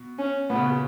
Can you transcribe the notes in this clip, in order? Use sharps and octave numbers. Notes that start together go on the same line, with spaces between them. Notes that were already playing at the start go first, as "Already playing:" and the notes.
Already playing: B2
C#4
A#2 B3
C#3
B2
C#3